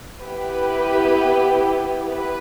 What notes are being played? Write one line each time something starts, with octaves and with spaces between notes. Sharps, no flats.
B3 E4 G4 B4
B4